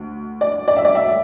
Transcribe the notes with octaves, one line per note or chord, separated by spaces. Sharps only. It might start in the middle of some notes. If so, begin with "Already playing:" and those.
Already playing: D2
D5
D5
E5
D5
E5